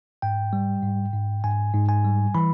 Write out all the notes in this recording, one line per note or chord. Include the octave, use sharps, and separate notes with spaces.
G#2 G5
G3
G#2
G#2
G#2 G#5
G#2
G#5
G3
E3 B5